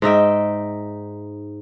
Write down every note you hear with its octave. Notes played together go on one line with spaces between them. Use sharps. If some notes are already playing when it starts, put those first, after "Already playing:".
G#2 D#4 E5 G5